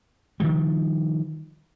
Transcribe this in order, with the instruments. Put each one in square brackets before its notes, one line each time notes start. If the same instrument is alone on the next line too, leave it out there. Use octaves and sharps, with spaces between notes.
[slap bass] D#3 F3 G3